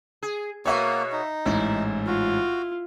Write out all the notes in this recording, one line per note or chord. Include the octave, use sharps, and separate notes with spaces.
G#4
B2 A#3 F#4 C#5 E5 C#6
D#4
A1 G#2 E4
F4 F#4